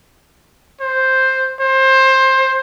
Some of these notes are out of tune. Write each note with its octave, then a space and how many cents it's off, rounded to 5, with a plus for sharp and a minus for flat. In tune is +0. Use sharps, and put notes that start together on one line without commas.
C5 +5
C5 +20